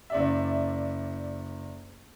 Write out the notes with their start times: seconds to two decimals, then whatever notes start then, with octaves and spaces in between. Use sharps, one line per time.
0.10 F#1 D5 E5